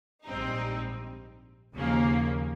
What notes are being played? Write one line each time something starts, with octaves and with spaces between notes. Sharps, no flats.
A#1 G#2 G3 C4 D#4
D#2 C#3 F3 A#3